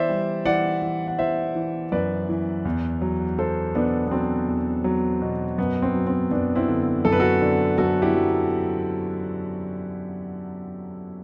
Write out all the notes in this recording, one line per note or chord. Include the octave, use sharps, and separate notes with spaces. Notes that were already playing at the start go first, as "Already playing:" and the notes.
Already playing: E3 C5 D5 E5
G3
E3 D5 F#5
E3
F#5
E3 C5 E5
E3
F#2 B4 D5
E3
E2
F#3
F#3 A4 C5
B2 B3 D4
B3
F#3 C4
E2
F#3
B2
F#2 B3
C4
F#3
C4
F#2 B3 D4
C4 E4
D3
F#2 A4
B4
F#4 A4
D3
F#2 F#4 A4
E4 G4
F#3